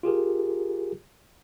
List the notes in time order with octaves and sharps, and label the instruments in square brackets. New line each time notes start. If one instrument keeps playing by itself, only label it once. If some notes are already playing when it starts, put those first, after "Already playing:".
[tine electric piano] F4 G4 G#4 A#4